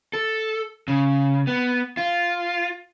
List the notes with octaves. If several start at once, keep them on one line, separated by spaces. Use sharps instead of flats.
A4
C#3
B3
F4